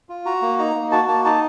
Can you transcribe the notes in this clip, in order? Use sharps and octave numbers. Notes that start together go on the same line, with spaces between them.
F4
F#4 A#5
A#3
D#4 A#5
A#3
F#4 A5
A#3 A5
D#4 A5